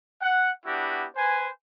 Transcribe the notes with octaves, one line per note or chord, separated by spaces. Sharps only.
F#5
B3 D4 E4 F#4 G4
B4 C5 G#5